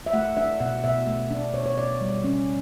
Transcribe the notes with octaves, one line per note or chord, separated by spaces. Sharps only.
E5
A3 F#5
D4 E5
B2 F#5
B2 E5
A3
D4
B2 C#5
C#5
B2 D5
G3
C#4